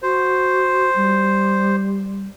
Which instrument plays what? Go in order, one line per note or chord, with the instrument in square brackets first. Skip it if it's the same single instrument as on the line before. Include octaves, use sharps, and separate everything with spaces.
[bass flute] F#4 [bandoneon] C5
[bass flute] G3